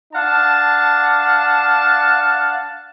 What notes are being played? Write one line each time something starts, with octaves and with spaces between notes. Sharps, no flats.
D4 F5 F#5 A5